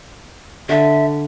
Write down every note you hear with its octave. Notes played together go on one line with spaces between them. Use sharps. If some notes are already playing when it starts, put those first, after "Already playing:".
D3 E5